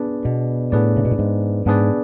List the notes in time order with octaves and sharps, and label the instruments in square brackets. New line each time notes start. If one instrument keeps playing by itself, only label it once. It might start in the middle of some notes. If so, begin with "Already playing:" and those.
Already playing: [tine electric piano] B3 D4 G#4 B4 D5
[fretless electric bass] B2
[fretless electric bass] A2 [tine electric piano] B3 D4 G#4 B4 D5
[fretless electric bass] C#3
B2
A2
G#2
[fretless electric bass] G#2 [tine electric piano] B3 D4 G#4 B4 D5